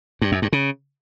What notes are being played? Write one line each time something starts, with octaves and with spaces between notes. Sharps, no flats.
G2
F#2
G2
C#3